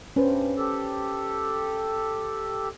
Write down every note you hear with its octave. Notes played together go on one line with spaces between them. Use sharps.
G2 C#4 B4 C5
G4 A4